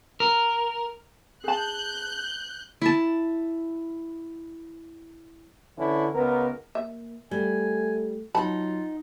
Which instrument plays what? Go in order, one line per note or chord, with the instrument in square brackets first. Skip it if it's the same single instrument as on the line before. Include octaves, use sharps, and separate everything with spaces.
[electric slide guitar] A#4
[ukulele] G#4 A5 [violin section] F#6 G6
[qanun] E4 A5
[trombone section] D3 E3 C#4 E4
C#2 B3 A#4
[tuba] A#3 [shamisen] E5
[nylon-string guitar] G3 [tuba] A3 [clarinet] G#5
[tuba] F#3 [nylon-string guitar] D#4 F#5 [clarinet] F4 [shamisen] A5 B5